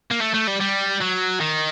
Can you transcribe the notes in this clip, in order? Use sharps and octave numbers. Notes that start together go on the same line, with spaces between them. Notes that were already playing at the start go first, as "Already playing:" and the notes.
A#3
A3
A3
G3
G3
F#3
D#3